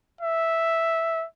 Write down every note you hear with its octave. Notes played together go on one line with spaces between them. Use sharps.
E5